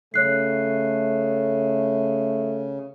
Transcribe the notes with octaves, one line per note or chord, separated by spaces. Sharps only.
C#3 A3 C#5 F#6 C7